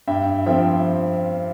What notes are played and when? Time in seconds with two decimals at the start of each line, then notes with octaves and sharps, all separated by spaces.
0.08 G2 E5 G5
0.46 F3 C4 E5 G5